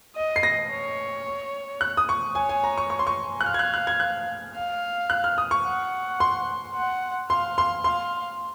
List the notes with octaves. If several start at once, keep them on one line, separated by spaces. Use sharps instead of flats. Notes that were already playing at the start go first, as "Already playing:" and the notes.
D#5
C7
A#6
C#5
F#6
D#6
C#6
C#5 G#5
G#5
A#5
C#6
C#6
C6
C#6
F#6
F5 F6
G#6
F#6
F#6
G#6
F#6
F5
F#6
F6
D#6
C#6
F#5
C6
F#5
F5 C6
C6
F5 C6